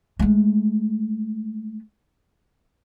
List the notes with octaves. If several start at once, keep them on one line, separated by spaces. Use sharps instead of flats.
G#3 A3